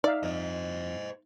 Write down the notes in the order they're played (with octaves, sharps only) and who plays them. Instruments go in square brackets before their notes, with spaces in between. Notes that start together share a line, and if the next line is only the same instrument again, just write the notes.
[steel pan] D#4 E5 F5 [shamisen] D5
[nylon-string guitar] F2 [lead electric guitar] C5 D#5